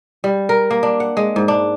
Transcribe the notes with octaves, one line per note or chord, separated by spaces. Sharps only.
G3
A#4
A#3
D4
F#5
G#3
G#2
D4